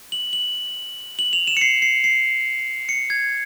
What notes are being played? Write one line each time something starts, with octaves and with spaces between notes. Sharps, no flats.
F#7
F#7
F#7
F7
E7
C#7
C7
C7
C7
C#7
G#6